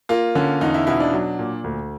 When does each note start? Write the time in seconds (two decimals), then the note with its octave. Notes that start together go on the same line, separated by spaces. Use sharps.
0.09 A#3 F4
0.35 D3 C#4
0.61 E2 D#4
0.74 E4
0.87 B2 E4
1.00 D4
1.13 F#3
1.39 A#2
1.64 D2